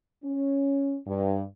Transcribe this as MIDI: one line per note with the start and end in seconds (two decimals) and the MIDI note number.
0.24 0.96 61
1.06 1.42 43